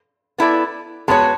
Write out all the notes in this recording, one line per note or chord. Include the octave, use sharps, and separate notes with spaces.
B3 E4 A4 D5
G#3 B3 F#4 C#5 A5